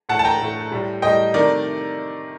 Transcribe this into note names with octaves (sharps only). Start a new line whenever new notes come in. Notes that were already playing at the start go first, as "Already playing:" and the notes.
A2 A3 F#5 A5
A5
G5 A#5
A2 A3
A2 G3
A2 G3 D#5 G5
C3 D#3 A3 A#4 D5